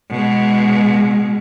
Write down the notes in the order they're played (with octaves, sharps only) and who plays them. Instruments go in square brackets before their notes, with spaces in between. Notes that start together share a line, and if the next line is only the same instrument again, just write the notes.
[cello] B2 G#3